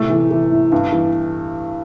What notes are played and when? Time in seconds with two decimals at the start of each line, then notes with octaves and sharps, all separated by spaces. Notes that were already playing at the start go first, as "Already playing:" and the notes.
Already playing: A2 C3 A3
0.10 E3
0.31 E3
0.52 A2
0.72 G2
0.92 E3